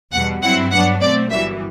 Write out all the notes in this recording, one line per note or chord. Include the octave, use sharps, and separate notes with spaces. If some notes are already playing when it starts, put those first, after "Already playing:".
E2 B2 G3 F#5
G2 F#3 C4 E4 F#5
G2 F#3 B3 D4 F#5
B2 A3 C4 D5
G1 F#2 E3 G3 E5